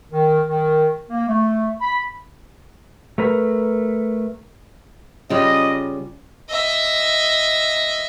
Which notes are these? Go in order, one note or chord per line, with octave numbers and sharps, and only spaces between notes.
D#3
D#3
A#3
A3
B5
A3 A#4 B4
C#3 G3 F4 D#5
D#5 E5